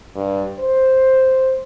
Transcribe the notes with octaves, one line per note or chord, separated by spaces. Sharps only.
G2
C5